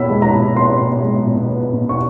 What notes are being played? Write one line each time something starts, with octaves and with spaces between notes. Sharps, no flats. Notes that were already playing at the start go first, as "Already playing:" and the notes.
Already playing: B2 B3 B5 E6
G#3
A#5
B2
B3 C6
B2
G#3
B2
B3
B2
C#6